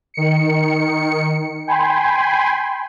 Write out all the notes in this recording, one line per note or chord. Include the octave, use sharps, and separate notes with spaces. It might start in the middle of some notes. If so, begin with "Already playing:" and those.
D#3 C#7
G5 G#5 B5 C6